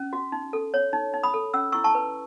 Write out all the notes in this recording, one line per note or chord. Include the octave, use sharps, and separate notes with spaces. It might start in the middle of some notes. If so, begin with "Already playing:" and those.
Already playing: C#4
F#4
D#4
A4
C#5
D#4
D#4
B5 D#6
A4
C#4 E6
E4 C#6 E6
A5 C#6
B4